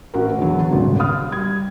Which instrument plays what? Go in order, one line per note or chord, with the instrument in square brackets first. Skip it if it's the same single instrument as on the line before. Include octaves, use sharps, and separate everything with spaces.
[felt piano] A1 F#4 A#4
E2 D3 F#3
D#1 G#1 D2 C#3
F5 D#6 F6
G3 G#6